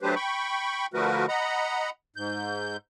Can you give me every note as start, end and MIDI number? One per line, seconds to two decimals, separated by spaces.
0.01 0.15 54
0.01 0.15 57
0.01 0.15 62
0.01 0.15 67
0.01 0.15 71
0.01 0.15 72
0.15 0.86 79
0.15 0.86 83
0.15 0.86 85
0.94 1.26 50
0.94 1.26 53
0.94 1.26 57
0.94 1.26 66
0.94 1.26 70
0.94 1.26 71
1.28 1.90 75
1.28 1.90 78
1.28 1.90 82
1.28 1.90 83
2.16 2.77 44
2.16 2.77 91